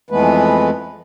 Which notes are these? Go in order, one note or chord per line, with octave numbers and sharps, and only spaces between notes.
F2 E3 G#3 A3 B3 B4